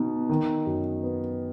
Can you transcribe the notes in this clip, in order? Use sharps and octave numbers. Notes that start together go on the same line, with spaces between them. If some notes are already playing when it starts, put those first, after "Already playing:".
Already playing: B2 D#4
D#3
F#2
B3